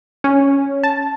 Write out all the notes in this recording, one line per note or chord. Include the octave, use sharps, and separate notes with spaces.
C#4
A5